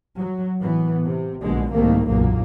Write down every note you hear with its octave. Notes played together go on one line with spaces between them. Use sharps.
F#3
A2 E3 B3
C3
A#1 G#2 B2 D3 G#3
C2 G#2 D#3 A3 A#3
F#1 B1 E2 A#2 A#3